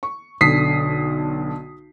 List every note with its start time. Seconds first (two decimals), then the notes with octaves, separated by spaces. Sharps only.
0.03 C#6
0.41 B1 D3 D#6 B6 C7